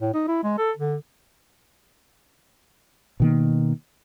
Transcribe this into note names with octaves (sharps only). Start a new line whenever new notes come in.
A2
D#4
E4
G#3
A4
D3
B2 D#3 A#3